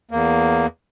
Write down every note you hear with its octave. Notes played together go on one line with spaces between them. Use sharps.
E2 A#3